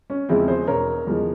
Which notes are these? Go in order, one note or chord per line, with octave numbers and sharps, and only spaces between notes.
C#4
E2 C#3 F3 G#3 C4 E4
G#4 C5
E1 A#4 C#5
E2 C#3 F3 G#3